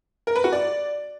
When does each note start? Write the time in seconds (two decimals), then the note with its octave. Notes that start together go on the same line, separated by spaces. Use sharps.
0.27 A#4
0.36 B4
0.44 F#4
0.53 D5